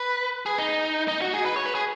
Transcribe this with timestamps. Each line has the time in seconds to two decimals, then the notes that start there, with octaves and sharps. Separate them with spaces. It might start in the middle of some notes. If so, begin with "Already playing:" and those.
Already playing: B4
0.46 G#4
0.58 D#4
1.08 D#4
1.22 F#4
1.34 G#4
1.46 B4
1.56 C#5
1.66 B4
1.75 G#4